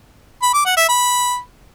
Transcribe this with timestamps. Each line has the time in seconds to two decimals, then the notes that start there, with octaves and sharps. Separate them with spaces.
0.42 B5
0.54 D6
0.65 F#5
0.77 E5
0.88 B5